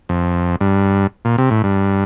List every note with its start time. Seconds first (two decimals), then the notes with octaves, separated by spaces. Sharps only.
0.09 F2
0.60 G2
1.25 A#2
1.38 C3
1.51 A2
1.64 G2